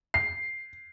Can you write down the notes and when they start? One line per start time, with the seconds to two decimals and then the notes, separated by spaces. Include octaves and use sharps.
0.14 C7